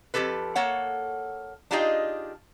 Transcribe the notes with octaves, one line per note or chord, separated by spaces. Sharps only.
F2 F#3 G4 A4 B4
A#3 A4 C#5 F#5
D4 D#4 F4 G4 G#4 D#5